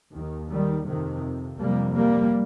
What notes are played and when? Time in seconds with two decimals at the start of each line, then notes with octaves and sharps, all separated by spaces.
0.13 D#2 D#3
0.49 D#3 G3
0.86 F2 C3 D#3
1.58 F2 C3 G3 A#3
1.95 G3 A#3